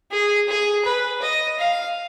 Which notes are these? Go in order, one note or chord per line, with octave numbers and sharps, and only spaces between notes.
G#4
G#4
B4
D#5
F5